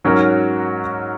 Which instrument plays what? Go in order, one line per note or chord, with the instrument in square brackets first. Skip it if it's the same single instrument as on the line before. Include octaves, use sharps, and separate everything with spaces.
[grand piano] G#2 F#3 C#4 F#4 A#4